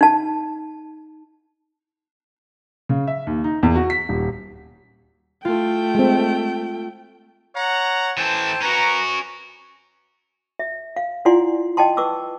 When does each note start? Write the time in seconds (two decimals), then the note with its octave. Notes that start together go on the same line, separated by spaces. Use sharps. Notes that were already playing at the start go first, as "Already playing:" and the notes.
0.01 D#4 A5
2.89 C#3
3.07 E5
3.27 D#2
3.44 D#4
3.63 E2
3.75 F#4
3.90 B6
4.09 D#1
5.45 A3 F4 G5
5.95 G#3 C4
7.55 C#5 F#5 A#5
8.17 E3 A4 C5 G5 A5
8.61 C#4 F#4 B4 A#5
10.59 E5
10.96 F5
11.25 E4 F4 D5 F#5 G#5 C6
11.77 D#5 F#5 G5 A5 C6
11.97 B4 C#6 D6 E6